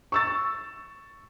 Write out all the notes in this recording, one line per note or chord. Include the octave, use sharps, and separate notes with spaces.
C#6 E6 A6